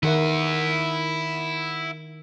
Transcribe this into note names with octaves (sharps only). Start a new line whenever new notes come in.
D#3 E4 A#4 E5 F#5